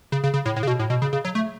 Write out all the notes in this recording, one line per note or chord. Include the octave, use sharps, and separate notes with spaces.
C#3
C#3
C#3
A2
A2
C#3
B2
A2
B2
C#3
C#3
F#3
A3